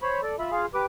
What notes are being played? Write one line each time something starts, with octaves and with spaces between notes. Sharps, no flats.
C5 C#5 B5
A4 D5
F4 E5 B5
F4 G#4 F5
G4 B4 D6